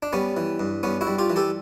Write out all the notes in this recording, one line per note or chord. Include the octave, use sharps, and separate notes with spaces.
D4
G3 B3 C#4
E3
G2
G2 B3 C#4
E4 F#4
G3
F4 G4
E3
G4 A4